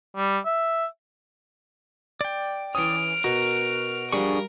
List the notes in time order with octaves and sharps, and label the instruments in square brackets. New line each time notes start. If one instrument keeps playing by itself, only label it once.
[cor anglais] G3
E5
[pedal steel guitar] D5 G5
[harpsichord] E3 C#4 [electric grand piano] D#6 [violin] F6 D7
[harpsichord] B2 [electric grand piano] F#4 [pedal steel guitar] A#4
[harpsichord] F3 G3 [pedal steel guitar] D4 G#4 C#6 [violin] A#4